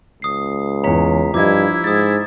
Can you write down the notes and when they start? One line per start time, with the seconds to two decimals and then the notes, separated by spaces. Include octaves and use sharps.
0.22 C#2 D#6 C7
0.84 E2 C#5 A#5 B6
1.34 G2 F3 E4 D#5 D6 G#6
1.84 G#2 D#6 A6